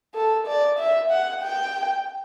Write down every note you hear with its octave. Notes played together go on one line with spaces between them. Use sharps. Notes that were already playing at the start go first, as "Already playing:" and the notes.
A4
D5
E5
F#5
G5